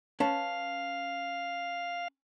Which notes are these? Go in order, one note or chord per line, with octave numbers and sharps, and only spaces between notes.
C#4 B4 F5 A5